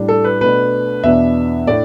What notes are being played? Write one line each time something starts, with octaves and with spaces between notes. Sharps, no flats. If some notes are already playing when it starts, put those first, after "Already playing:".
Already playing: A2 G3 D4
A4
B4
B2 A3 D4 B4
E2 B2 B3 D4 E5
A2 A3 D4 D5